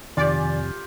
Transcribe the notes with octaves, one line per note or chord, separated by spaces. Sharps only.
F2 C3 D#3 F4 G4 D5 G#5 A6